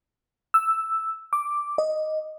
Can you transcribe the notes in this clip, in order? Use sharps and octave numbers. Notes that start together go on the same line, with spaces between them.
E6
D6
D#5